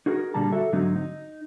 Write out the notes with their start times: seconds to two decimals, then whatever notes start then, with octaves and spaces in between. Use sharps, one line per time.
0.06 D#4 F#4 G#4 A#4
0.34 A#2 D3 G3 A5 A#5
0.52 F#4 A4 E5
0.73 G#2 D3 F#3 A3 C4 D#4
0.96 D#4